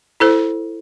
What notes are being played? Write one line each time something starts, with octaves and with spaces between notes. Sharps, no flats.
E4 A4 C5